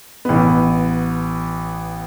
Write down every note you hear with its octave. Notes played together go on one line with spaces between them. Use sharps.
A1 B3